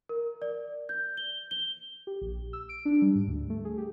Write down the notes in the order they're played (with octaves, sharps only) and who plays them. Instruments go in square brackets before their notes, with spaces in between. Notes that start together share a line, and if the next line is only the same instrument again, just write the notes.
[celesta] A#4
D5
G6
G7
G7
[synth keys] G4
A#1
E6
D7
D4
G3
G#2
D2
A3
G#4
G4